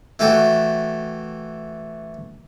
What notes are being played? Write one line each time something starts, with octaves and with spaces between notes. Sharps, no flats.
E3 A3 F#4 G4 A4